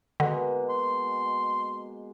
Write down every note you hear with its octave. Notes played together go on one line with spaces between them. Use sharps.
B2 D3 G#3 A#3
C6